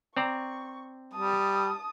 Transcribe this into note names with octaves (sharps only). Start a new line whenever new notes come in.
C4 D5 A#5 C#6
G3 A5 D#6